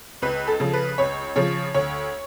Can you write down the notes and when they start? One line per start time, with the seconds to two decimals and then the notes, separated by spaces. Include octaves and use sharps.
0.22 C#2 B4
0.47 A4
0.60 C#3 F3
0.73 B4
0.98 C#2 C#5
1.36 C#3 F3 C#5
1.74 D2 C#5